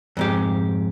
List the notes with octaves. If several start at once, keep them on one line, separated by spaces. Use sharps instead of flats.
F2 G#2 G4